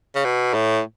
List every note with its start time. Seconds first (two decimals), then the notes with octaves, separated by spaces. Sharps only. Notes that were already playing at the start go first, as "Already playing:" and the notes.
0.15 C#3
0.25 B2
0.54 A2